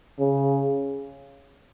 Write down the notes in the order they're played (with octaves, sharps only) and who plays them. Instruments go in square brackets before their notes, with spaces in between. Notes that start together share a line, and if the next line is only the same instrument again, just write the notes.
[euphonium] C#3